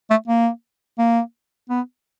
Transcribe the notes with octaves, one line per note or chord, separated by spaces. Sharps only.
A3
A#3
A#3
B3